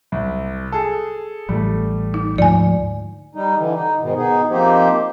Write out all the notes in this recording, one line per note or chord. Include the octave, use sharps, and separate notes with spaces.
C2
G#4 A4
A1 G3 A3
D#4
D2 G#2 F3 D5 G#5
G3 D#4
D3 E3
D#4
G#2 B2 D#3
B3 D#4 G#4
F3 A#3 C4 D#4 G4 C5